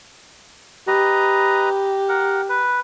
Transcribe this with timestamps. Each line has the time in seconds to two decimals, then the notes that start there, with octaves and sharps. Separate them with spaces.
0.88 G4 B4 D#5 A#5
2.09 A#4 F#5
2.49 B4